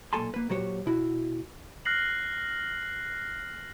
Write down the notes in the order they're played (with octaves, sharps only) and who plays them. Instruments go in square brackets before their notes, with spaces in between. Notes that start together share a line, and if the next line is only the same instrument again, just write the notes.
[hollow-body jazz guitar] B1 A#2 A4 G#5 A5 C6
A#3 B4
A#2 F#3 F#4 G4 C5 C#5
B2 E4 F#4
[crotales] F6 F#6 A#6 C7 F#7